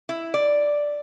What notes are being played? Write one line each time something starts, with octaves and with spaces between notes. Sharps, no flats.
E4
D5